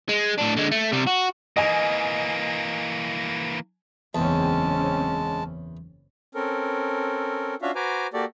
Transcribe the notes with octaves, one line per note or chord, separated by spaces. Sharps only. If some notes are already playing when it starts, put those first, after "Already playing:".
G#3
A2 D4
D3 G#3
A3
C3 G3
F#4
E3 A#3 D#5 G#5
F#1 E2 G#3 C4 C#4 A5
C4 C#4 A4 A#4
C#4 D4 F4 F#4 E5 F5
F#4 B4 C5 G#5 A#5 D6
A#3 F#4 G4 A4 D5